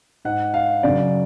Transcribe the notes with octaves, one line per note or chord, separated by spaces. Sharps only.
G#2 F#5
F5
F#2 C#3 D5